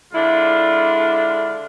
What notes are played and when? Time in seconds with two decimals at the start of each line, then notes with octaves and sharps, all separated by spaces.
0.13 D3 G#3 D4 E4 F4